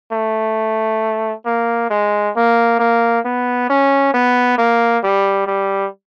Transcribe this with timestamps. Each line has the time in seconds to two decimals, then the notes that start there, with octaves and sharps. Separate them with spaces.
0.13 A3
1.46 A#3
1.90 G#3
2.36 A#3
2.79 A#3
3.25 B3
3.70 C#4
4.14 B3
4.58 A#3
5.03 G3
5.47 G3